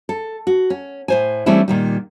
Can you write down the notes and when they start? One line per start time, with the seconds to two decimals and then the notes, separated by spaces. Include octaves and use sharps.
0.09 A4
0.47 F#4
0.70 C#4
1.08 A2 C5 G#5
1.46 E3 G3 A3 C4 C#4 E4
1.68 A#2 D#3 G3